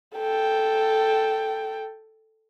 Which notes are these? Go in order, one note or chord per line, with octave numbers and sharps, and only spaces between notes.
A4 G5